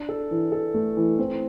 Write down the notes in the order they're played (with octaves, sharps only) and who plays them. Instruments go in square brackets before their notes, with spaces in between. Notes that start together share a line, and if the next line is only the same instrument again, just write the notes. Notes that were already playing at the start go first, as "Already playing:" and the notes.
Already playing: [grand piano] D4
A4
E3
A4
A3
E3
C4